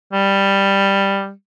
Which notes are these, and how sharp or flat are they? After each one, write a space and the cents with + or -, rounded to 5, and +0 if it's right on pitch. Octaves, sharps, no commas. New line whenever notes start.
G3 +5